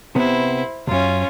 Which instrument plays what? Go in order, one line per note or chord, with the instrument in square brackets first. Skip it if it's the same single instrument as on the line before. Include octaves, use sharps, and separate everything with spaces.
[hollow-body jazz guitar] C3 B3 [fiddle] E4 C5
[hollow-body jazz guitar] C#2 F#2 [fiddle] C#4 F4